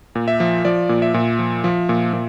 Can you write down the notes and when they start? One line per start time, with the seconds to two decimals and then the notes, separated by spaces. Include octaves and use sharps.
0.15 A#2
0.28 E5
0.40 F3
0.65 F3 D5
0.89 A#2
1.02 E5
1.14 A#2
1.39 F3
1.64 F3
1.89 A#2
2.13 A#2